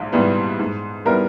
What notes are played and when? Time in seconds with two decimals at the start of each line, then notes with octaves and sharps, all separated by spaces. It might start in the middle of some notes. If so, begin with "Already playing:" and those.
Already playing: A#1 G#2 E4
0.12 G#2 G3 B3 E4
0.59 G#2
1.05 G3 B3 E4 A#4